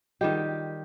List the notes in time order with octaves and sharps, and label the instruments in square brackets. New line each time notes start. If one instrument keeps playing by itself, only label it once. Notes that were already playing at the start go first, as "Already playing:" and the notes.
[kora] D#3 G3 G4 [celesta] F4 G#4 D#5